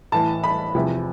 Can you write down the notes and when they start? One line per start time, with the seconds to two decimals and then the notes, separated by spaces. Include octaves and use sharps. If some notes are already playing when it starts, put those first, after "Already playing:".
0.12 A2 E3 A5
0.44 B5
0.75 E2 C3 F3